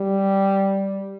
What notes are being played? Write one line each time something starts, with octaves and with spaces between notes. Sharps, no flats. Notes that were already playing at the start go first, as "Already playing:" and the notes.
Already playing: G3